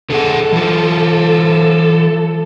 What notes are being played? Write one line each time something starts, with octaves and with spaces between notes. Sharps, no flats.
D3 G#4 A4 F#5
E3 F4